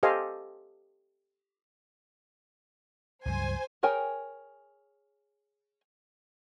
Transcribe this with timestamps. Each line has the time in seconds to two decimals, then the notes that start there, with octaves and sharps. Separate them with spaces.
0.03 G4 A4 C5 D#5 F5 G#5
3.25 C#2 G2 F#3 C5 G#5
3.83 G#4 A#4 C#5 G5 G#5